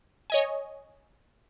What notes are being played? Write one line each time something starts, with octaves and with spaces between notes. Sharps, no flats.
C#5 D#5 G#5